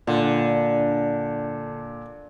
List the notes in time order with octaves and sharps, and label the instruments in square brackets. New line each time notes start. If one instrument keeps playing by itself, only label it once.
[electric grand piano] A#2 [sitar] D3